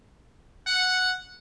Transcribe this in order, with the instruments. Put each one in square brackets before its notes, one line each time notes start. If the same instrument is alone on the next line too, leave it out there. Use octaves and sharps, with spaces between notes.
[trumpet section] F#5